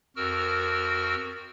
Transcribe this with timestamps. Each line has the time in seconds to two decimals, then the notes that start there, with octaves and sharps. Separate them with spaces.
0.16 F2 F#4 A#4 E6 F6